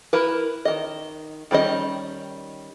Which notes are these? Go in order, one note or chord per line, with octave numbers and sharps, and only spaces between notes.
E4 A#4 B4
D#3 D#5
D#3 G3 C#4 D#5